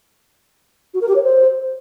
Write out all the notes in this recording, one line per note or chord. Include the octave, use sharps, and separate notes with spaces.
F#4
A#4
G4
C#5
C5